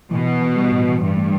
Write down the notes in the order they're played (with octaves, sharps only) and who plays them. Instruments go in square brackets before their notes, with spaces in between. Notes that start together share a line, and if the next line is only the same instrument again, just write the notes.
[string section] B2 [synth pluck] E3
[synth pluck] E3
E3
G3
A2
E3
[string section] G2 [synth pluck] E3
[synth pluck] A3